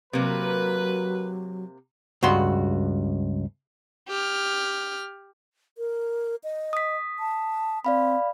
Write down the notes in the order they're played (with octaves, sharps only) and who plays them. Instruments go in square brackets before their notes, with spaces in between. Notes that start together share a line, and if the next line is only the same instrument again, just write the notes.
[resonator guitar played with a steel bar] C3 A#3 [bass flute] F#3 [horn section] A#4 B4
[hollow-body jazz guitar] C#2 G2 F#4 C6
[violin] G4 F6
[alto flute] A#4
D#5
[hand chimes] D#6 B6
[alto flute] A5
[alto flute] C4 [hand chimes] D5 F5 B5